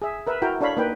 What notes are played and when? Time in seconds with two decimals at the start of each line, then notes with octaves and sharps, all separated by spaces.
0.02 G#4 E5
0.27 A#4 B4 E5
0.42 E4 F#4 A#4 G5
0.61 D4 A4 C#5 F5 B5
0.77 A#3 D#4 B4 G5